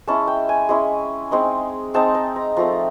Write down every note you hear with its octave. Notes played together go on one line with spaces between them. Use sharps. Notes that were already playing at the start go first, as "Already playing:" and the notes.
G#3 C#4 E4 A5
G5
G#5
G#3 C#4 E4
G#3 C4 D#4
G#3 C4 D#4 A5
A#5
A#5
F3 A3 C4 A#5